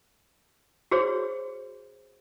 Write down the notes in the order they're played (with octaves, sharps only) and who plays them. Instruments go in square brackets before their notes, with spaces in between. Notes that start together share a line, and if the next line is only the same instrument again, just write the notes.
[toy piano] F#4 G#4 C5 C#5